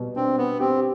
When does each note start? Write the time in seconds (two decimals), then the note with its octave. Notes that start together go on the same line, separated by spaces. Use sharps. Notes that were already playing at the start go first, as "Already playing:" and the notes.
Already playing: B2 G3
0.16 C4 D4
0.38 B3
0.60 C4 G4